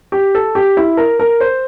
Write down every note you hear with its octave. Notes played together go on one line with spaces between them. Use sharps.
G4
A4
G4
E4
A#4
A#4
C5